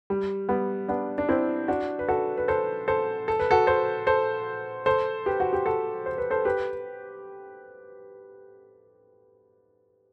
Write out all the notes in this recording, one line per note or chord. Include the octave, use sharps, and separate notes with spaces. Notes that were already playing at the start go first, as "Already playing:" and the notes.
G3
G3 B3
B3 D4
D4
C4 E4
D4 F#4
B4
F#4 A4
B4
A4 C5
A4 C5
A4
B4
F#4 A4
A4 C5
A4 C5
A4 C5
G4 B4
F#4
G4
F#4 A4
C5
B4
A4 C5
G4 B4